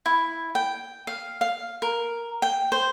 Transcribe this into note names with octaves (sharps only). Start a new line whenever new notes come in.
E4
G5
F5
F5
A#4
G5
C5